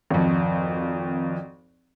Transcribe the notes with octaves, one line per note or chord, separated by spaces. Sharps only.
G#1 F2